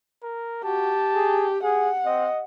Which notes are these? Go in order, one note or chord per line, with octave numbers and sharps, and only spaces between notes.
A#4
F#4 G4 A5
G#4
G#4 F#5
C4 D#5